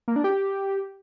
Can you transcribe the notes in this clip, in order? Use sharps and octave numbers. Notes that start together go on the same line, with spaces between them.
A#3
D4
G4